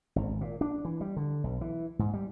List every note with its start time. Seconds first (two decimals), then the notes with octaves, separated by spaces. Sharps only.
0.16 G#1
0.41 A#2
0.61 D4
0.85 E3
1.01 G3
1.17 D3
1.44 B1
1.61 E3
1.99 G#2
2.14 G3